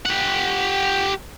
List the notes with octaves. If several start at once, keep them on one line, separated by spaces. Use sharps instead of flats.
G4 F#5